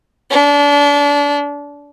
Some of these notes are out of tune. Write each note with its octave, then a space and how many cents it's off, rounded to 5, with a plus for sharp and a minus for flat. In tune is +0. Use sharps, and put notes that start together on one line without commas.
D4 -30